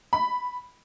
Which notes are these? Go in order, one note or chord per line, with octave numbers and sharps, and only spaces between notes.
B5